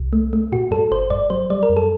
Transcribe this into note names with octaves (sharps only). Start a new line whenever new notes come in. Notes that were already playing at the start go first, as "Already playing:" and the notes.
Already playing: C2
A3
A3
A#2 F#4
G2 A4
G1 C5
G2 D5
F#3 C5
G3 D5
A#4
F#2
A4